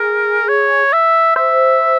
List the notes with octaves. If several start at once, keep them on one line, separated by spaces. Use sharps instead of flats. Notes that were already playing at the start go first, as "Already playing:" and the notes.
Already playing: G#4 A#4
C#5
E5
C5 E5